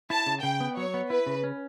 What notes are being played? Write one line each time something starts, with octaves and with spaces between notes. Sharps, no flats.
E4 A5
C#3
C#3 G5
B3
F#3 C#5
B3
E4 B4
C#3
C#4